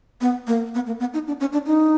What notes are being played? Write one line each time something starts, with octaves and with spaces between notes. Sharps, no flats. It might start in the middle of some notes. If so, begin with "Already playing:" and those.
B3
A#3
B3
A#3
B3
D#4
D4
C#4
D4
D#4